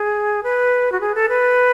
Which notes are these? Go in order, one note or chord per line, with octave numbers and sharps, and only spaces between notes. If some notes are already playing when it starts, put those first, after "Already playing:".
Already playing: G#4
B4
F#4
G#4
A4
B4